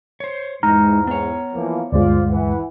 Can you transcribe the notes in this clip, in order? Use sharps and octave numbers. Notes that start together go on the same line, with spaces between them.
C5 C#5
E2 G#2 G#3 D#4 A#5 F6
B3 C#5
E3 F3 A#3
D2 G2 G#3 F4 C5 D5
E3 F#5